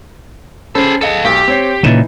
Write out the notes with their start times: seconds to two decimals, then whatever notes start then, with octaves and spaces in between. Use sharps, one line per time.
0.75 C#4 G#4 A4 C5 B5
1.01 G#4 A4 D#5 F5 C#7
1.25 B1 G4
1.48 C4 C#5 C7
1.83 A#2 C#3 E3 D#4